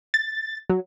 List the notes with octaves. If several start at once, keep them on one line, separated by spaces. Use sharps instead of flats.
A6
F#3